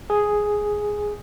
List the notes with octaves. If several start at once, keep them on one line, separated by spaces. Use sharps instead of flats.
G#4